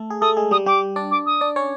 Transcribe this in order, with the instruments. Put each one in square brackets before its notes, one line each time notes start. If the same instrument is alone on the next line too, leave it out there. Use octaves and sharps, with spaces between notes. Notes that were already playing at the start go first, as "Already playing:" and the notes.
Already playing: [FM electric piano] A3 A4
G#4
[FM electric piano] A3 A4 [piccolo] D#6
[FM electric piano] G#3 G#4
[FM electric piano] G3 G4 [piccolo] D#6
[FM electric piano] G3 G4 [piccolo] D6
[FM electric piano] D4 D5
[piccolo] D6
D#6
[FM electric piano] D4 D5
C#4 C#5